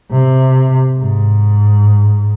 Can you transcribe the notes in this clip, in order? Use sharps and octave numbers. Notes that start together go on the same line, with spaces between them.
C3
G#2